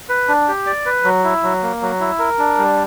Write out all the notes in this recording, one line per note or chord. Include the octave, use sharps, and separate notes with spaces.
B4
D4
G4
D5
B4
F#3
E4
F#3
A#3
F#3
E4
A#4
D4
G3